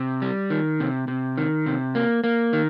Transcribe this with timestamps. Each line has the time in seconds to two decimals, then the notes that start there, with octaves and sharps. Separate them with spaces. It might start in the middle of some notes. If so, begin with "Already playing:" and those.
Already playing: C3
0.22 G3
0.50 D#3
0.80 C3
1.08 C3
1.38 D#3
1.66 C3
1.95 A#3
2.24 A#3
2.53 D#3